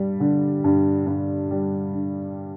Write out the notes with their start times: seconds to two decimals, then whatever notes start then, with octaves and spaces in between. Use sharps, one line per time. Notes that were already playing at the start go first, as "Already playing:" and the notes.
Already playing: G2 G3
0.20 D3
0.64 G2
1.06 G2
1.51 G3
1.93 D3